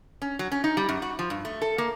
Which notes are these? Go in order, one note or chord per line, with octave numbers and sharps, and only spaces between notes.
C#4
F#3
C#4
D#4
G3
F#2
F#4
F3
G2
A3
A4
A#3